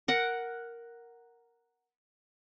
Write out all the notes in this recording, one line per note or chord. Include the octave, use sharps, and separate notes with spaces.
A#4 F#5